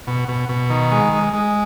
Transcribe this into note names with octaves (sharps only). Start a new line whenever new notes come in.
B2
B2
B2
D#3
G#3
G#3
G#3